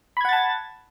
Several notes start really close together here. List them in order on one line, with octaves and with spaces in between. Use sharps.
B5 G#6 F#5 A6 A5